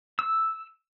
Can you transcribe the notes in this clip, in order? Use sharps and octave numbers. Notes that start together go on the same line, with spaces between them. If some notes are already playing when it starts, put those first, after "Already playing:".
E6